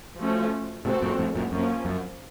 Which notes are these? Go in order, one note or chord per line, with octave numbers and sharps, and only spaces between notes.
F3 A3 C#4 F#4 A4
A2 C3 C4 F#4 A4
F#2 A#2
F2 A2
F#2 A#2
F#2 F3 A#3 C#4
F#2